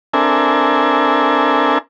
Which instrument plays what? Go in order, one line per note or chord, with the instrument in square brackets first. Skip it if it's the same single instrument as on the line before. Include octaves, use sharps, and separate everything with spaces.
[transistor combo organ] C4 D4 A4 A#4 E5 G#5